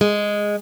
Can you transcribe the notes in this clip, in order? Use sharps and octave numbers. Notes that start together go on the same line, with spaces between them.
G#3